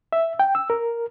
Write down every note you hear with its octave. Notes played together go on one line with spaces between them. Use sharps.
E5
G5
E6
A#4